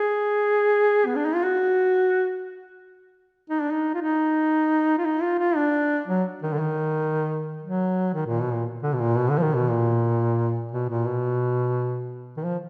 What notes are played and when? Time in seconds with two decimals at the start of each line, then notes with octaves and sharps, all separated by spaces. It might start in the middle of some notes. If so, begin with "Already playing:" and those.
Already playing: G#4
1.06 B3
1.15 D4
1.25 D#4
1.34 F4
1.44 F#4
3.50 D#4
3.61 D4
3.72 D#4
3.94 F4
4.02 D#4
4.98 F4
5.05 D#4
5.22 F4
5.39 F4
5.56 D4
6.08 F#3
6.42 D#3
6.54 D3
6.59 D#3
7.63 F#3
8.14 D#3
8.27 A#2
8.40 B2
8.53 A#2
8.83 D3
8.93 B2
9.00 A#2
9.17 B2
9.30 D3
9.38 F3
9.42 D#3
9.55 B2
9.69 A#2
10.72 B2
10.89 A#2
11.06 B2
12.37 D#3
12.43 F3